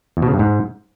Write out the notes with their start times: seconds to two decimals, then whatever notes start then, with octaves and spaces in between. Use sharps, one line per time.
0.17 E2
0.22 B2
0.28 C#3
0.34 G2
0.39 G#2